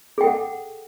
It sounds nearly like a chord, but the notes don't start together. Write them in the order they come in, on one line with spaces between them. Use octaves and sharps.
G#4 G5 A4 F#5